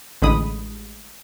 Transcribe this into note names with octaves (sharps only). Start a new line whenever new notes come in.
A1 D3 G#3 B5 D#6